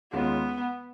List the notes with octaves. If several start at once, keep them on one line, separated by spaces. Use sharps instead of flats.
D#2 D#3 G#3 B3 C#4 F4